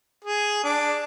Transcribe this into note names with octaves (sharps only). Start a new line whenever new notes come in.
G#4
D4